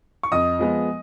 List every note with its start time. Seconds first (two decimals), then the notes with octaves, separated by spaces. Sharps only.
0.23 C#6
0.32 F2 D#5 D#6
0.59 F3 G#3 B3